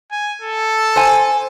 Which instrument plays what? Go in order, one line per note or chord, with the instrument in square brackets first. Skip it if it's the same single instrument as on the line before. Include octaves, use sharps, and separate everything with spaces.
[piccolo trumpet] G#5
A4
[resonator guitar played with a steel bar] C5 G#5